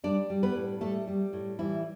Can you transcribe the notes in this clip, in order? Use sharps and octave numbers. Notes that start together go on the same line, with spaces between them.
G3 D4 D5
G3
B3 B4
A2
G3 A3 A4
G3
A2
E3 G3 E4